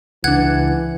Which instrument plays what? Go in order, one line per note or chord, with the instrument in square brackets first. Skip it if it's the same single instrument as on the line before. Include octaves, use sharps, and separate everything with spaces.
[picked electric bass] C#2 D4 [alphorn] E3 [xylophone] F#5 F#6 G#6